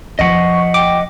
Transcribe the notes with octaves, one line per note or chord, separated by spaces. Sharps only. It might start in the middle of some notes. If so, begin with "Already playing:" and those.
F2 F3 D#5 F#5 C#6
G5 D6